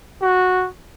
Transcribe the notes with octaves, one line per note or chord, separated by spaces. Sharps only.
F#4